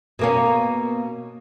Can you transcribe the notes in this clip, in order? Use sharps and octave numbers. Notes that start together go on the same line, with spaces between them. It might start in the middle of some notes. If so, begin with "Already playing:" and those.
B2 A#3 C#4